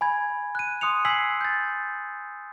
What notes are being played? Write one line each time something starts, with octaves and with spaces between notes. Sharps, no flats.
G#5 B5 G#6
F#6 D#7
C6 D#6 F#6 C#7 F7
G#5 E6 G#6 B6 C7 F#7
G6 A6